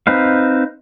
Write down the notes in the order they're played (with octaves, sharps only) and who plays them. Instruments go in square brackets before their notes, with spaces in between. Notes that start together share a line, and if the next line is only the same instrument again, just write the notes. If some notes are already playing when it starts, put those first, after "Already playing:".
[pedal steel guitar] C4 D#4 B4 F5